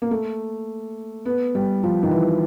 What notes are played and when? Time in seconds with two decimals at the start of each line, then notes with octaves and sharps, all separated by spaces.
0.02 A#3
0.11 A3
1.25 B3
1.55 G3
1.83 F3
2.03 D#3
2.11 E3